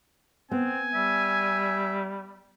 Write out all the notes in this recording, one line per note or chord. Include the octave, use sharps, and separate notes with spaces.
B3 C4 G#5
G3 E5